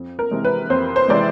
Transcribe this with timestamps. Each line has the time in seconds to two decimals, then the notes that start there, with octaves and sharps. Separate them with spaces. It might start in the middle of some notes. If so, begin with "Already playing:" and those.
Already playing: F2
0.19 A#4
0.31 C3 E3 G#3
0.45 B4
0.70 F2 C5
0.96 C5
1.08 C3 E3 G#3 D5